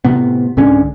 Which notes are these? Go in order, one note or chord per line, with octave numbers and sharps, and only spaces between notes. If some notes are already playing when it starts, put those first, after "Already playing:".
A2 C3 B3
C2 G#2 D3 C#4